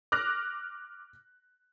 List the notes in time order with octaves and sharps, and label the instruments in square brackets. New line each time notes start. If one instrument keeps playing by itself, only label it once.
[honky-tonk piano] D6 F6 F#6 A#6